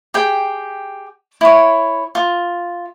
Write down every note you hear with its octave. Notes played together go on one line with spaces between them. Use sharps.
G4 G#4 G5
E4 C#5
F4